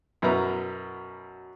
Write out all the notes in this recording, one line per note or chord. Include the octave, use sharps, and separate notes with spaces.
F#2 B2 E4 B4 A#5